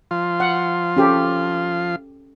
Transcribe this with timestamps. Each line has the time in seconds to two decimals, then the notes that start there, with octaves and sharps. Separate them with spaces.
0.11 F3 F4 C6
0.40 F#5
0.97 C#4 G4 A4